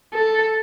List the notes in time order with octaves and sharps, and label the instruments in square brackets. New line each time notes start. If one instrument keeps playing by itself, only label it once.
[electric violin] A4